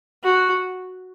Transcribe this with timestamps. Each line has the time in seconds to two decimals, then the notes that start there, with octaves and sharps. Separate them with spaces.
0.23 F#4